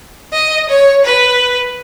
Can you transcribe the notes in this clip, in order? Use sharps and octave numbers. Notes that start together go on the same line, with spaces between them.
D#5
C#5
B4